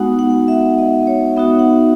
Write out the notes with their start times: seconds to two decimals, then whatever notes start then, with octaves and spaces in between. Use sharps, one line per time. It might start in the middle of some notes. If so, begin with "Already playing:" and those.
Already playing: G#3 B3 D#4 F#4 F#5
0.19 F#5
0.48 E5
0.78 D#5
1.07 C#5
1.36 B3 D#4 F#4 E5
1.59 F#5